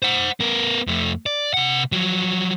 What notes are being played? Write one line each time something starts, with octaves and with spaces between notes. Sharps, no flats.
C5 F#5
B3 A#4
F2 A3
D5
C3 F#5
F3 F#3